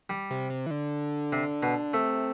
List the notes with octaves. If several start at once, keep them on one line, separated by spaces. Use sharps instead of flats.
G3
C3
C3
E3
D3
C3
B2
C3 A3